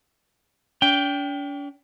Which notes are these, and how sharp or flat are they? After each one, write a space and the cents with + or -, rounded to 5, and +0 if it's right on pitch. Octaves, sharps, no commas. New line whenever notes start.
D4 -45 G5 +0